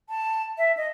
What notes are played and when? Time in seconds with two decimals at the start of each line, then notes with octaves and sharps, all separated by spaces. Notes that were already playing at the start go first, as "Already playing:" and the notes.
0.09 A5
0.58 E5
0.77 D#5